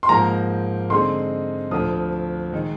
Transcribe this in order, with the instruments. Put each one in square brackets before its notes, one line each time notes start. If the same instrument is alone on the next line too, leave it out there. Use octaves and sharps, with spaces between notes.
[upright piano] C6
[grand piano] G#2 F3 A#3 [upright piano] A#5
[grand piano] D3 G#3 C4 D#4 [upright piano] C6
[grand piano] D2 D3 F3 [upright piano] D#6
[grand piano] D#3 G#3 D#4 G#4